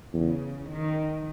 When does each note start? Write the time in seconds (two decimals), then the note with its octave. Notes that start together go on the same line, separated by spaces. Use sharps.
0.14 E2 C#3
0.68 D#3